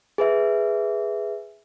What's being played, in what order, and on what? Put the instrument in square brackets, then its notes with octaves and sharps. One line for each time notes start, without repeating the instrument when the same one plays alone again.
[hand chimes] G#4 B4 E5